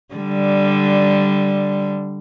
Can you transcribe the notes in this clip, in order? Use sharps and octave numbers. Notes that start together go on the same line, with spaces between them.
D3 G3